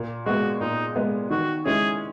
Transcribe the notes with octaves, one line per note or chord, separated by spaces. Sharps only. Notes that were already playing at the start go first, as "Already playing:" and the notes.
Already playing: A#2
G#3 B3 F#4
A#2 D#4
G#3 B3
D#3 F#4
G#3 C#4 E4 G#4